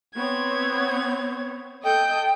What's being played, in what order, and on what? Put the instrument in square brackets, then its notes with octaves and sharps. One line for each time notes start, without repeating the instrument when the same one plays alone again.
[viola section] B3 C4 C#5 [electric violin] G#6
[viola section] A4 [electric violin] D#5 G6 [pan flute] G5